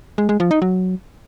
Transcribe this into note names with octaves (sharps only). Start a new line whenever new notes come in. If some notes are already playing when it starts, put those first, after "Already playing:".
G#3
G#3
F3
D#4
F#3